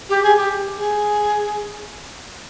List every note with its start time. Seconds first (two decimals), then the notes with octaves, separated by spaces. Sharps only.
0.09 G4
0.23 G#4
0.37 G4
0.77 G#4